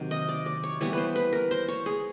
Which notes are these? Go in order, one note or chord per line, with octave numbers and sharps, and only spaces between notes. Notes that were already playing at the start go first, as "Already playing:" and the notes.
Already playing: C3 D#3 F#3
D#5
D5
D5
C#5
E3 G3 B3 C#5
B4 C5
B4
A#4
C5
C#5
G#4